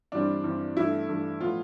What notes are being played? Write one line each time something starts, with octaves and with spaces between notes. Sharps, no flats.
G2 E3 G3 C4 D4
G2 E3 G3 C4
G2 E3 A3 E4
G2 E3 A3
A2 F3 B3 F4